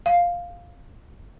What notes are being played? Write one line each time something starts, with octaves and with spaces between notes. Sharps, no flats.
F5